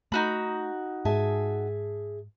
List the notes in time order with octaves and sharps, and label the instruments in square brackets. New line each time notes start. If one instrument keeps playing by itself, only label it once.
[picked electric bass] A3 [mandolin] D#4 F#4 B5
[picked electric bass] G#2 [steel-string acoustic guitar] G#4 E5 A5